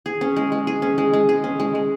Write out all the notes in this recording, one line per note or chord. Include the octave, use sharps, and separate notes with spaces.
G#4
C#4
G#3
G#3
G#4
C#4
G#3
G#3
G#4
C#4
G#3
G#3